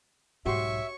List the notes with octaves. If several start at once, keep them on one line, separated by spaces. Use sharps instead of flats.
B1 G#2 F#4 G4 C#5 E5 C6 C#6